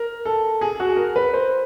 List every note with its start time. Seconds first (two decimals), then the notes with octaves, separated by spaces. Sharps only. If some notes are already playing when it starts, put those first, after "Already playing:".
Already playing: A#4
0.25 A4
0.61 G#4
0.80 F#4
0.97 A#4
1.16 B4
1.34 C5